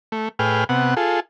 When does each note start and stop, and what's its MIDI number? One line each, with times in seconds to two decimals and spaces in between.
0.12 0.29 57
0.39 0.64 45
0.39 0.64 68
0.39 0.64 71
0.39 0.64 79
0.39 0.64 89
0.69 0.94 48
0.69 0.94 59
0.69 0.94 78
0.97 1.20 65
0.97 1.20 68
0.97 1.20 69